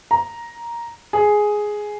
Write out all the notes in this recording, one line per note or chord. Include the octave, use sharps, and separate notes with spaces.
A#5
G#4